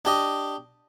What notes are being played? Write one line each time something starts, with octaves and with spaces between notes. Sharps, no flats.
D4 G4 D#5